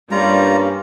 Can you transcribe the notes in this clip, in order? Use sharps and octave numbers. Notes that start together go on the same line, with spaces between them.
G2 G3 A#3 C#4 F4 A#5